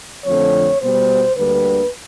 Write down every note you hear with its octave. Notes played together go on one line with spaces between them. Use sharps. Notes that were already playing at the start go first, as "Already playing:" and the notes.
F2 D3 F3 A3 C4 C#5
B2 G3 B3 C5
D2 D3 G3 A#3 B4